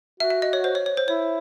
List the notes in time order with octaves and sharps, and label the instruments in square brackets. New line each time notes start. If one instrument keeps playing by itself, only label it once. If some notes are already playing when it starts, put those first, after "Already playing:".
[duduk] F#4 [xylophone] E5
[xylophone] E5
D#5
C#5
C5
C#5
C#5
C5
[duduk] E4 [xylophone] C#5